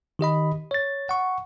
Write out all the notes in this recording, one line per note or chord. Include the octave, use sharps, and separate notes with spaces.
D#3 G4 D#5 B5
C#5 A6
F#5 C#6